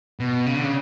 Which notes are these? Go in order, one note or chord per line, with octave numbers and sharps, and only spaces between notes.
B2
C#3
D3
C#3